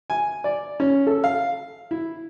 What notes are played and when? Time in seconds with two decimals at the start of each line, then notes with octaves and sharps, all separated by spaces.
0.10 G#5
0.44 D5
0.80 C#4
1.07 A4
1.24 F5
1.91 E4